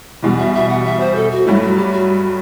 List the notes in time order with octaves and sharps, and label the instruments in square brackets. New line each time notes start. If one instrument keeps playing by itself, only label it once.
[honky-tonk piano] E2 B2 G3
[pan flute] E5
E5
F#5
E5
C5
A4
F#4
[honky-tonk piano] G2 F#3 A3 [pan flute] E4
[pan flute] F#4
G4
F#4